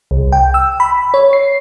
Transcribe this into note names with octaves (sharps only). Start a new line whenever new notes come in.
C2
G5
E6
B5
C#5
C7